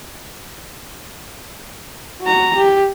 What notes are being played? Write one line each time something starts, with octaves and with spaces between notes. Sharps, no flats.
F#4 A#5
G4